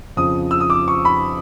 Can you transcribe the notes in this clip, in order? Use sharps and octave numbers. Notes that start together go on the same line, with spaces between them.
F2 C#3 F3 D#6
E6
D#6
D6
C#6
B5